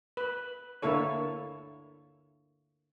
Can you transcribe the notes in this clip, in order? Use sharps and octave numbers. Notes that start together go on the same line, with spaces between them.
B4
D3 A#3 E4 A4 C#5